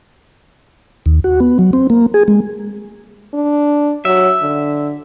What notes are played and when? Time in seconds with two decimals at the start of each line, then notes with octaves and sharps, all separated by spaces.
1.06 D#2
1.24 F#4
1.40 B3
1.59 F#3
1.73 C4
1.90 A#3
2.14 G#4
2.28 G#3
3.34 D4
4.05 F#3 E5
4.42 D3